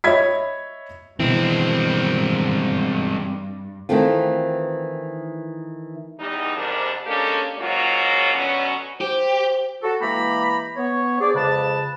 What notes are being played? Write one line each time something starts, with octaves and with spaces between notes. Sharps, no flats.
C#5 D#5 E5 B5 G#6 B6
G2 B2 E3 G#3 C4
D#3 E3 A3 C4 F4
E2 G3 D#4
F2 G#2 C3 G3 D4 A#4
G#3 A#3 C#4 D4 G4 A4
G#2 C#3 F#3 A#3 F4 C#5
B2 D3 F#3 B3 C#4
G4 C5
F#4 A4
E3 G#3 A#3 G4 A#5 B5
B3 C#5
D4 G#4 C5 D5
F2 C#3 G#3 B4 A5